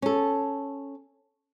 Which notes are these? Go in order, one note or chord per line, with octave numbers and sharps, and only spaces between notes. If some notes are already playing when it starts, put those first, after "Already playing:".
C#4 A4